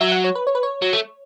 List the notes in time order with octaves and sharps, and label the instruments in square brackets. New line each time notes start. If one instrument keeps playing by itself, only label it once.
[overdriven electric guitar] F#3 [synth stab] E5
[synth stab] F#5
C#5
B4
C#5
B4
C#5
[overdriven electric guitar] F#3
A3